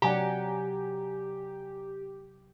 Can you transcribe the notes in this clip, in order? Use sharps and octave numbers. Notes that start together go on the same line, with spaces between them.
C3 F#3 G4 D5 F#5 G#5 A#5